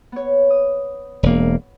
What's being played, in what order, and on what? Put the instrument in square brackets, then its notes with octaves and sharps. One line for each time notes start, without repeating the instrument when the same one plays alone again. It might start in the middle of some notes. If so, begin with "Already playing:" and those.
[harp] B3 C#5
D#6
[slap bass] E1 A#3